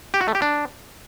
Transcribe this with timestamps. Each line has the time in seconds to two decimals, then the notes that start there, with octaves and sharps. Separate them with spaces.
0.14 G4
0.21 F#4
0.28 A3
0.35 G4
0.42 D4